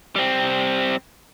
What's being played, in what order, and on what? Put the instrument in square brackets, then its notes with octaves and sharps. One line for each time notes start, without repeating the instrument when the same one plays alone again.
[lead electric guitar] G3 C4